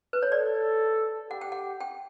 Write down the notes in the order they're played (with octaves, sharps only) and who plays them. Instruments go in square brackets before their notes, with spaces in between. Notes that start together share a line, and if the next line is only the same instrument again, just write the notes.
[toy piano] B4
C#5
[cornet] A4 [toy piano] D5
[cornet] G4 [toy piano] F#5
[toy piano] G5
F#5
G5